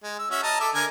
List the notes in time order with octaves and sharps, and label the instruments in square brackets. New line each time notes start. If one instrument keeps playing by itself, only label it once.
[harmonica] G#3
E6
C#4 F#4 E5
D#5 A5 A#5
A4 E5 D6
D3 A#4 G#5